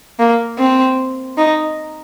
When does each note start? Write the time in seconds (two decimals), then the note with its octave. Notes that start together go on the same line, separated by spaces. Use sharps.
0.19 A#3
0.59 C4
1.38 D#4